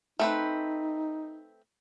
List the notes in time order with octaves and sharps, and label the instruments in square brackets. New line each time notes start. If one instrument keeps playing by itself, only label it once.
[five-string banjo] A3 C4 B4 [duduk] D#4